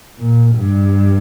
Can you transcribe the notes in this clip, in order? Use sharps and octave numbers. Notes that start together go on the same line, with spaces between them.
A#2
G2